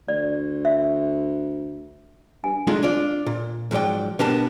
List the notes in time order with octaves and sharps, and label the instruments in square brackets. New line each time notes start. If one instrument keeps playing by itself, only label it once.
[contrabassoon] D2 [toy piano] D5
[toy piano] E5
[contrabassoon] G2 [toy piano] G#5
[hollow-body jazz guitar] G#3 A3 D4 D#4 F4
D4 F4 D5
A#2
G#2 F3 F#3 D5 G5
B2 B3 D4 G4 A#4 A5